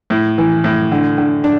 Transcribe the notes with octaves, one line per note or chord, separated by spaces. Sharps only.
A2
E3
A2
D3
D3
D4